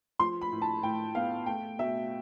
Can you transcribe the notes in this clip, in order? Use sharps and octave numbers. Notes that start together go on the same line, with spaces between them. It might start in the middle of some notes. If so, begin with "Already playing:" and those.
F3 C6
B5
A2
A5
A2 G5
B3 F5
A3 G5
B2 E5